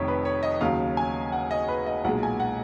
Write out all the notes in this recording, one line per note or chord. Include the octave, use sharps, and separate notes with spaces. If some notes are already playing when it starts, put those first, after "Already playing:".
Already playing: F1 F2 D#3 C#5
B4
C#5
D#5
D#2 C#3 F#3 F5
G#5
F#5
D#5
B4
D#5
B1 A#2 G#3 F#5
G#5
F#5